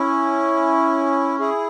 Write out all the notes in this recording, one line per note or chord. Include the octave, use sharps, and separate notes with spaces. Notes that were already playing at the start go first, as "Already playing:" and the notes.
Already playing: C#4 E4
E4 G#4